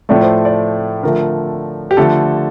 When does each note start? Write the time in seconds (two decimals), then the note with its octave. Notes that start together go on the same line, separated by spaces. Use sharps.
0.09 A2 F3 A3 D5
0.21 C5
0.45 D5
1.03 D3 F3 A3 A#4
1.91 G4
1.97 D3 F3 A3 A4